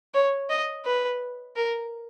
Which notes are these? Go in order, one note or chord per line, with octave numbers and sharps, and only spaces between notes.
C#5
D#5
B4
A#4